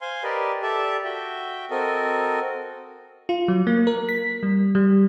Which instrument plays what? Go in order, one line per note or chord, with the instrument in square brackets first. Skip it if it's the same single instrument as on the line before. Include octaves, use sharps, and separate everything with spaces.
[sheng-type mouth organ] C5 F5 G#5 C6
G4 A#4 B4 D5 D#5
G4 A4 D5 E5 A5
F#4 E5 G5
C4 F#4 A4 A#4 D#5
[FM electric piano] F4
F#3
A#3
A#4
B6
G3
G3